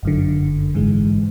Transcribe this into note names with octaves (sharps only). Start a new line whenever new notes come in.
G1 F#2 D3
A1 G#2 E3 G#3